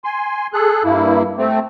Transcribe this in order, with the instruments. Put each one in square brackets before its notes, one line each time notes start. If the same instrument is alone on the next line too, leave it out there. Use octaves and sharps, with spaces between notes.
[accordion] G#5 C6
G#4 A4 F#6
G2 A#3 E4
A3 C4